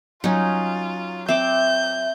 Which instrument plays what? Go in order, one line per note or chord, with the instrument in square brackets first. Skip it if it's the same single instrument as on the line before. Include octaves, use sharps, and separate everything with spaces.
[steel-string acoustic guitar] F#3 [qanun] C#4 D#4 [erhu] F4
[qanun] C4 D6 [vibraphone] E5 [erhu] G6